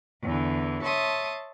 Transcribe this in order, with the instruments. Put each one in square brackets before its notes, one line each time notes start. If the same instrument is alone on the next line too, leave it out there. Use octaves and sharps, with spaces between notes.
[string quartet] E2 D3 E3
C#5 E5 A5 C6 D#6